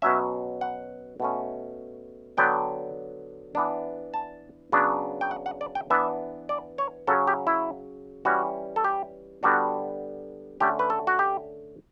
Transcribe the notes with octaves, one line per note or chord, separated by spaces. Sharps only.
B2 F#3 C#4 E5
F#5
B2 A3 C#4
D3 F#3 B3 D4 G5
E3 B3 D4
A5
C#3 F#3 B3 D4
G5
F#5
F#5
D5
G5
E3 B3 D4 E5
D5
C#5
C#3 F#3 C#4 A4
G4
E4
E3 G3 C#4 F#4
A4
G4
D3 G3 B3 D4 F#4
D3 A3 C#4 G4
B4
A4
F#4
G4